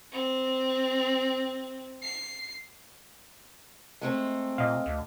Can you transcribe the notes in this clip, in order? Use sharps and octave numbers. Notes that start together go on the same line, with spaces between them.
C4
C7
G#3 A3 C4
A#2 D#5 F5
D2